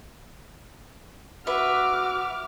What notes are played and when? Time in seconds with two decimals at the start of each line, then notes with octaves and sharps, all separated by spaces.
1.47 F#4 B4 E5 D6 F6